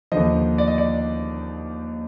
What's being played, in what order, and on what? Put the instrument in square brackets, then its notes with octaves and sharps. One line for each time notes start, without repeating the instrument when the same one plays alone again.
[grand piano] D#2 D3 F3 D#5
D5
D#5
D5